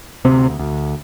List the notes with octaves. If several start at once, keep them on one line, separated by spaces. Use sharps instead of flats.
D2 C3 C4
D2